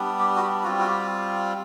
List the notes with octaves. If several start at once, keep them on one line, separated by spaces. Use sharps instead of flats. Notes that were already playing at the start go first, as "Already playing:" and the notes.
Already playing: G3 B3 D4
G4
F#4
G4
G3 C4 F4 F#4
F#4
G4